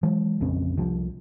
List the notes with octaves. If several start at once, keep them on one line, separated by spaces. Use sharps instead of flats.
E3 F#3 G#3
A#1 F2 C#3 C4
C2 F3